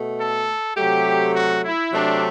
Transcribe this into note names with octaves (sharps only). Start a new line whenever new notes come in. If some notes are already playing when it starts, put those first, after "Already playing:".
Already playing: B2 A3
A4
C3 F#3 A3 G4
F#4
E4
C3 F#3 A3 D4